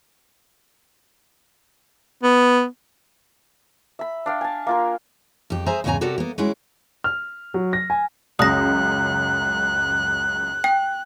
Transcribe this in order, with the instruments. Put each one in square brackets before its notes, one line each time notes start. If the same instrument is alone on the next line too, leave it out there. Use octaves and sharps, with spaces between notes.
[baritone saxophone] B3
[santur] E5 B5
D4 F5 G5
G#5 A5
A#3 F4 A#4
[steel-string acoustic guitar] F2 G4
G#4 C5 E5 G#5 A#5
E2 G#2 C#3 C#5 G#5 A#5
C3 F#4 G4 A4 A#4 D5
A#3 B3
F#3 G#3 C#4 E4
[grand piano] F6
F#3
A#6
G#5
[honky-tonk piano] C#2 F#2 [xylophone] D#6 A#6 [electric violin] F#6
[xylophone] G5